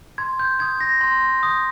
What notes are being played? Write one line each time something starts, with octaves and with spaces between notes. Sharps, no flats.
C6 G#6
G6
D#6 G6 G#6
A#6
C6
D#6 G6